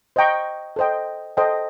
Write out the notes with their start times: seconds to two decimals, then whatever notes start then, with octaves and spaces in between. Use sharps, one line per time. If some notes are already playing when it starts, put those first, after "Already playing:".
0.16 C5 D#5 G5 A#5 C#6
0.76 A4 C5 D#5 G5
1.37 A4 C5 D#5 G5